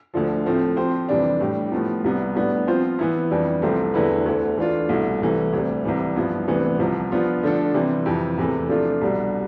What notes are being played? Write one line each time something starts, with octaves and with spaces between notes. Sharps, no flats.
D2 D3 F3
A2 F3 A3 C4
F3 C4 G4 C5
F2 C3 E3 G3 D4
A2 G3 D4 G4
A2 F3 B3
C2 C3 G3 B3
A2 G3 B3 D4
F3 C4 F4 C5
E3 B3 E4
F2 E3 G3 D4
C2 C3 F3 A3 C4
E2 D3 A3 E4 B4
D2 D3 A3
E3 A3 D4 F4
C2 B2 A3 E4
C2 C3 E3 A3 E4
D2 C3 G3
C2 C3 E3 G3
G2 F3 B3 E4
D2 C3 E3 B3 D4
C2 C3 F3
F3 B3 D4 F4
D3 F3 A3 D4 A4
C3 E3 G3 C4 E4
F2 C3 E3
E2 C3 E3 A3
C3 F3 A3 D4 F4
C2 B2 G3 D4